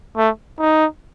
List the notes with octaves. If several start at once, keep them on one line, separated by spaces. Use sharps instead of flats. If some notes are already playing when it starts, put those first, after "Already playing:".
A3
D#4